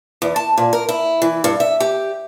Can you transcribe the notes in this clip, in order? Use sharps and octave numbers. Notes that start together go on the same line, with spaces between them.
E2
A5
A#2
A#4
E4
E3
G2
E5
G4